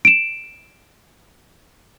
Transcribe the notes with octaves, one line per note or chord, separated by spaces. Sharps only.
D7 E7